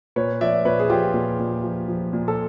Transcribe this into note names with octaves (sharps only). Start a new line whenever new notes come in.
A#2 B4 C#5
F3 D5 E5
A#2 B4 C#5
G#4
F3 F4 G4
A#2
A#2
F3
F3
A#2
A4